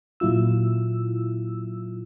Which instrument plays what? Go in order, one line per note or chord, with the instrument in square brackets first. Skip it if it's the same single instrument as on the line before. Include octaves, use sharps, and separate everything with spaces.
[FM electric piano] A#2 F#3 E4 F4 E6